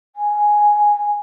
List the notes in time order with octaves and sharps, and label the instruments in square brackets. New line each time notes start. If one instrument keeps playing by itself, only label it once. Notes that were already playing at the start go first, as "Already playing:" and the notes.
[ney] G#5